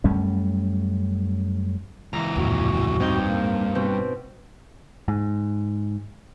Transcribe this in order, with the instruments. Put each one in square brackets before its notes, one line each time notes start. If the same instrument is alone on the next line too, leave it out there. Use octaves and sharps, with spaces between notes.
[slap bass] F#2 G3 A3 C#4
[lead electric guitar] C#2 E3 [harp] A#5
[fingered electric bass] D1 F2 A#2 [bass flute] F#4
[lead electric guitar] G2 [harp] C4 D#4 G6
[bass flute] A#3
[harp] B2 C4
[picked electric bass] G#2